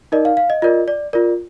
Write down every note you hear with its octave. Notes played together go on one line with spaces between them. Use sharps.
D#4 A#4 D5 D#5
F5
F5
D#5
F4 A#4 D5 D#5
D5
F4 A#4 D5